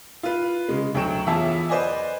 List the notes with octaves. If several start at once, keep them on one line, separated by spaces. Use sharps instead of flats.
F4 B4
C#3 G#3
D2 F#3 G5 C#6 E7
E2 F4 G#4 E5 A5
B4 C5 D5 D#5 G#5